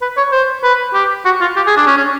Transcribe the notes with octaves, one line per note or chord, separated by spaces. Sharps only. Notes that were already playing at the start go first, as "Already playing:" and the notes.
B4
C#5
C5
B4
G4
F#4
F4
G4
G#4
D4
C#4
C#4